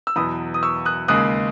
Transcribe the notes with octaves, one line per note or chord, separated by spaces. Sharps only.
E6
E2 B2 F#3 B5 D#6
D#6
C#6 E6
D#6 F#6
D#2 C#3 G#3 D#6 F#6